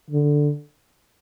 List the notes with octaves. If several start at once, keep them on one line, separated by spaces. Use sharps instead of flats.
D3